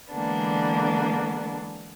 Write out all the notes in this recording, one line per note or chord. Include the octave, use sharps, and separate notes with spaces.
D3 E3 G#3 A#3 B3 D4